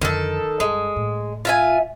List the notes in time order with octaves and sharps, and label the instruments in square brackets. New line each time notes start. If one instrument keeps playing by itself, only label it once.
[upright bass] F2 D3 [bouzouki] D#3 A4
[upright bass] G2 [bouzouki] G#3
[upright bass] A2
[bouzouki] F4 E5 G#5